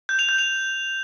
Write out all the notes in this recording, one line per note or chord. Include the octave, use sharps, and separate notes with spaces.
G6
F7
G6
F7